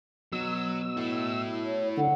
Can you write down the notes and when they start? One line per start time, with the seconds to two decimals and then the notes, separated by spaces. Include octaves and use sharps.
0.33 B2 F#3 E6
0.97 E4 A4
1.66 C#5
1.97 D3 F#5